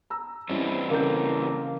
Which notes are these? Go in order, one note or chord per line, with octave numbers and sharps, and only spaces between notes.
A#5 E6
E3 G3 C4 C#4 E4 G4
C#3 A#3 A4 G6